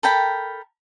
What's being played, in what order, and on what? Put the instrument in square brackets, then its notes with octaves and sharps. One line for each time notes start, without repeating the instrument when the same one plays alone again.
[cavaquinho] A4 A#4 G5 B5